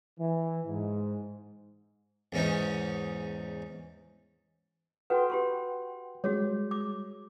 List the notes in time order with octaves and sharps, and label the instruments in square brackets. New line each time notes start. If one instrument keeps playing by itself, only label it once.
[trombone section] E3
G#2
[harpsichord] E2 G#2 C#4 D#4
[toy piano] F#4 A4 B4 [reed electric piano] F#5 G5 C6
[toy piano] G4 B5 C#6
[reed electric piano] G3 G#3 [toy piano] F#4 G#4 C#5
[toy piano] D6